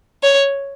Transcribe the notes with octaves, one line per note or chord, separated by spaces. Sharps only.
C#5